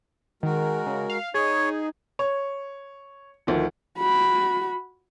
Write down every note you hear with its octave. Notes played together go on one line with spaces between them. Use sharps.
D#3 G#3 F#4 A#4
C#3
F5
D#4 G#4 C#5
C#5
D2 D#3 F3
F#4 B5